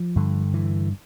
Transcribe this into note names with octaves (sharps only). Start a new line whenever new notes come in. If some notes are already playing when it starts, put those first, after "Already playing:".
Already playing: F3
G2 D3
E3